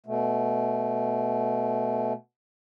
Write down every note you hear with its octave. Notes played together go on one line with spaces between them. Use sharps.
B2 A3